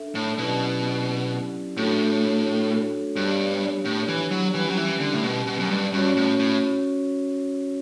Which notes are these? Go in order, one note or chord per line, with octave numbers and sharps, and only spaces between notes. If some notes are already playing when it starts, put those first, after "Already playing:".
Already playing: D4 A4 E5
A2
B2 F#3 C#4 E4 G4 D5
A2 A3 D4 F#4 A4 C#5
G2 B3 D4 G4 C#5
A2
E3
F#3
E3 G3 C#4 G4 B4
F#3
E3
D3
A2
B2
B2
F#2
G2
G2 C#4 F#4 C#5
A2
A2